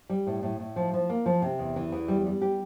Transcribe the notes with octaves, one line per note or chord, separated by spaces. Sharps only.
G3
A2
A2
A2
F3
F3
A#3
F3
C3
E2
E3
E2
G3
G3
G4